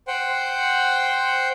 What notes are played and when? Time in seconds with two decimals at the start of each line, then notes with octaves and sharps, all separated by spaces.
0.07 C5 F#5 G5